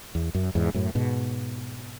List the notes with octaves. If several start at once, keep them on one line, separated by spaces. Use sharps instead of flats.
E2
F#2
E2 G#2
F#2 A2
G#2 B2